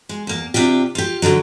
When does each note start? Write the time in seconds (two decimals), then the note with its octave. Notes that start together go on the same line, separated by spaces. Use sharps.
0.09 G#3
0.27 E2 A#3
0.54 C3 D4 F4 G4
0.95 F4 G4
1.22 F#2 D3 E3 F#3